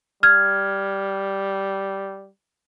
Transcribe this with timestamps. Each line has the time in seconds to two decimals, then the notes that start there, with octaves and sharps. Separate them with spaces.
0.23 G3 F6 G#6